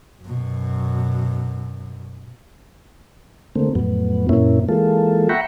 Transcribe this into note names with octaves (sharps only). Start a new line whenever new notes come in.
F#2 B2
D3 A3 A#3 C4
F2 A2 F#3 B3
F#2 A#2 A#3 C#4 E4
E3 G#3 A#3 F4 A4
E5 F#5 G5 A#5 B5 C#6